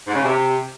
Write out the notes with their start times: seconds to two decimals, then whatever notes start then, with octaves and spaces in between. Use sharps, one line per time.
0.07 G#2
0.15 C#3
0.22 C3